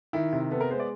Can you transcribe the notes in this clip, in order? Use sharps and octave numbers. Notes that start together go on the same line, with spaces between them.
D#3 E4
C3
B3 A4
A#4
G#3 C5
D5